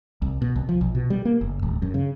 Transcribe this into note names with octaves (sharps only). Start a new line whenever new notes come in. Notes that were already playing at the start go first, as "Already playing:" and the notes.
C2
B2
C2
F3
B1
B2
G3
A#3
F#1
D1
F#2
C#3